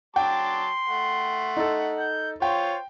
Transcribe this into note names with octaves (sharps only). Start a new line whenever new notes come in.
F#3 G5 A5 C6 D6
A3 F#5
D#4 A4
G6
F4 C5 C#5 G5